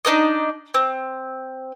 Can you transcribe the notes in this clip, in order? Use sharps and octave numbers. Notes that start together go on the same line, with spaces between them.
D4 D#4 A#4 D#5
C4